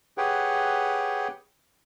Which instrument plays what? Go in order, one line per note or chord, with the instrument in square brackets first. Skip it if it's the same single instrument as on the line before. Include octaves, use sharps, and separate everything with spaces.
[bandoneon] G4 G#4 B4 C#5 F#5 G5